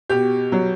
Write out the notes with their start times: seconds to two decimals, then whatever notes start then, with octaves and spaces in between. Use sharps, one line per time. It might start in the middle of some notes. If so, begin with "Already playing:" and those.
0.09 B2 G4
0.52 F#3